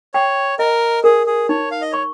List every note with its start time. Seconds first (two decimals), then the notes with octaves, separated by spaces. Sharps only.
0.14 C#5 G5
0.59 A#4 D#5
1.04 G#4 A#4
1.27 G#4
1.49 D#4 C#5
1.72 F5
1.81 D#5
1.92 C#5 C#6